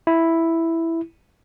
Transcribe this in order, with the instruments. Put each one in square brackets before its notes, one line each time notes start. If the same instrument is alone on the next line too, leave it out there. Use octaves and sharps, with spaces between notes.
[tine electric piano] E4